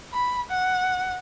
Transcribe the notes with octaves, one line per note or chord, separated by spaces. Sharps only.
B5
F#5